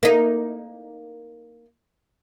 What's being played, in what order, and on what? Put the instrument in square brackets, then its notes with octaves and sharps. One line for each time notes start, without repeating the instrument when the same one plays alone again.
[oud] A#3 D#4